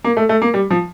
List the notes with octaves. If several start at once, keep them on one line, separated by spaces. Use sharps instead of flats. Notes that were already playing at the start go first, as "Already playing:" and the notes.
A#3
A3
A3
A#3
G3
F3